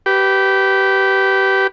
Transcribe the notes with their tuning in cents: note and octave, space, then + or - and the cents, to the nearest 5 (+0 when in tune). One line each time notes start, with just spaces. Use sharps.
G4 -20 B4 +0